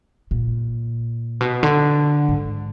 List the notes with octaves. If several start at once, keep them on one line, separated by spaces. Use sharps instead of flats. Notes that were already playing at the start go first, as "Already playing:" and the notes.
A#2
B2
D3
G#2